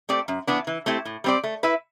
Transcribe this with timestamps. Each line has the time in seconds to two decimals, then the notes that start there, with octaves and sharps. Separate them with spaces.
0.09 A3 C4 G4 D5
0.28 F#2
0.47 E3 B3 D4
0.67 E3
0.86 A3 C4 E4 G4
1.05 A2
1.24 G3 C4 G4 D5
1.44 A3
1.63 E4 B4 E5